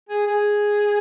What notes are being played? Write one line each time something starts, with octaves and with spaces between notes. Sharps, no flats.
G#4
G#4